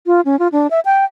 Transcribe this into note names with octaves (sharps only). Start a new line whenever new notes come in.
F4
C#4
F4
D4
E5
G5